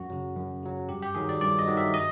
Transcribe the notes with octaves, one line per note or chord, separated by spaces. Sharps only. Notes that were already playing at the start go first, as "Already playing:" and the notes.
Already playing: F#2 F#4
C#3 F#3
F#2
C#3 F#3
G2 G4
G4
D#3 F#3 G#4
D5
G2 D5
D#5
D#3 F#3
E5
D#5